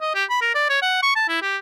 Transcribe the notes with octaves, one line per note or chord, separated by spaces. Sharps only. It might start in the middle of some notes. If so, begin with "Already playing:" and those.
D#5
G4
B5
A#4
D5
C#5
F#5
C#6
A5
E4
G4